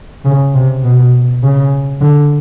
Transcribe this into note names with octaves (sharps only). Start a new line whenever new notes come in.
C#3
C3
B2
C#3
D3